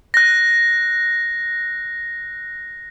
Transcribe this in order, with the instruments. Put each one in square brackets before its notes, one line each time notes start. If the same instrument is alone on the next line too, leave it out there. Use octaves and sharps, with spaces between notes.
[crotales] F#6 A#6